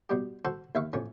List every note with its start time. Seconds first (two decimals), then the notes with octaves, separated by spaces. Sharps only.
0.09 B2 G3 G4
0.45 F#4 A4 C5
0.75 D#2 E5 F5 C#6
0.93 A1 F2 C#4